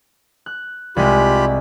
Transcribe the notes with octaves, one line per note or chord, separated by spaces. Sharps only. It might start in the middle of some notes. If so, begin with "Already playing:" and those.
F#6
C2 G#3 F4 G4 B5